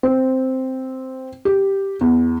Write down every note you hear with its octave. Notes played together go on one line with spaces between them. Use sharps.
C4
G4
E2